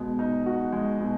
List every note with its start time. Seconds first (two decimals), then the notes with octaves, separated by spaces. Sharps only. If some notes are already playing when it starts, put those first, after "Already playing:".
Already playing: B2 G#3
0.19 D#4
0.46 F#4
0.72 G#3
1.01 B2